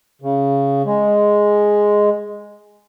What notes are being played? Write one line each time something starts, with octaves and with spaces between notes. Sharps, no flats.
C#3
G#3